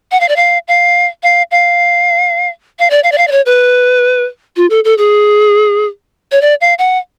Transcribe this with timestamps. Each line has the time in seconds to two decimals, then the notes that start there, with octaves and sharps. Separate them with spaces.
0.11 F#5
0.20 F5
0.28 D5
0.36 F5
0.68 F5
1.23 F5
1.51 F5
2.79 F5
2.90 D5
3.04 F5
3.12 D5
3.18 F5
3.27 D5
3.31 C#5
3.46 B4
4.56 F4
4.70 A4
4.84 A4
4.98 G#4
6.32 C#5
6.41 D5
6.61 F5
6.78 F#5